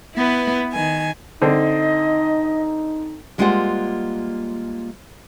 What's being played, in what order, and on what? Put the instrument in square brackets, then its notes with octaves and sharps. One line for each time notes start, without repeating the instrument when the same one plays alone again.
[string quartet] B3 E4 B4
D#3 G#5
[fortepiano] D3 C4 [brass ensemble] D#4 [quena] D#5
[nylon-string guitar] G3 G#3 A#3 F4 C5 F#5